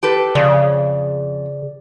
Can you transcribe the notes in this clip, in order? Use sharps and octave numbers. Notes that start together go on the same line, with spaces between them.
G4 A4 B4
F2 C#3 D5